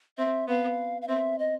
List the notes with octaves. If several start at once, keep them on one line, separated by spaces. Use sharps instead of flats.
C4 E5
B3 F5
F5
C4 E5
D#5